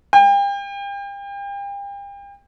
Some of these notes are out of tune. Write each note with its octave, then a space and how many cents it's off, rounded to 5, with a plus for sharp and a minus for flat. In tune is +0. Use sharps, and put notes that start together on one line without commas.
G5 +35